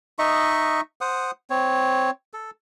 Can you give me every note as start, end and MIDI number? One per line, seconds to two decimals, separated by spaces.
0.19 0.81 63
0.19 0.81 75
0.19 0.81 76
0.19 0.81 85
1.01 1.31 72
1.01 1.31 78
1.01 1.31 87
1.50 2.11 60
1.50 2.11 73
2.33 2.51 69